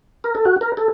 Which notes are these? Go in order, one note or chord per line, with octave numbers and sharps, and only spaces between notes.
A#4
A4
F#4
A#4
A4